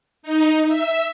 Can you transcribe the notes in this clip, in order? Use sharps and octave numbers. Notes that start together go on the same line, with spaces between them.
D#4
E5